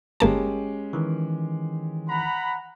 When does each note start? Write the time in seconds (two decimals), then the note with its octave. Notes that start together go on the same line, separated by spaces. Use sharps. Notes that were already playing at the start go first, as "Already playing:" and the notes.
0.20 G1 G#3 A#3 C#4 G4 A5
0.93 D#3 E3
2.09 F#5 A#5 B5